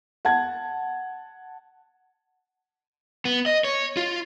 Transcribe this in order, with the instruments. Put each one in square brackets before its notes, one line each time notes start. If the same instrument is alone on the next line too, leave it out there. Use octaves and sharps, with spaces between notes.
[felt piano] F#5 A5 G#6
[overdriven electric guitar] B3
D#5
C#5
F4